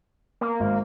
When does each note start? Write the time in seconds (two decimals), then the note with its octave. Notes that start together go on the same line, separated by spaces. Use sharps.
0.41 A#3
0.60 G#1